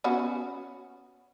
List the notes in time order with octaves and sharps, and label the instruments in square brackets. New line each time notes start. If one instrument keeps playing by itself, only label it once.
[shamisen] B3 C#4 F#4